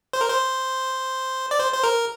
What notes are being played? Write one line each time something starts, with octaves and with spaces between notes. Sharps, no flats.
C5
A#4
C5
D5
C5
C5
A#4